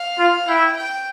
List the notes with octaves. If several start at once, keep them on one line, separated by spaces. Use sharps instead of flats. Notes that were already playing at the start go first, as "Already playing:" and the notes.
Already playing: F5
F4
E4 G5
G5